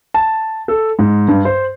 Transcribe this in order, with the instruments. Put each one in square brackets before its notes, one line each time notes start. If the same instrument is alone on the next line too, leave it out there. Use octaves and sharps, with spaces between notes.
[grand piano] A5
A4
G#2
G2
C5